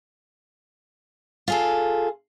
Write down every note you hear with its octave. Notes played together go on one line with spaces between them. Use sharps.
F4 G#4 A4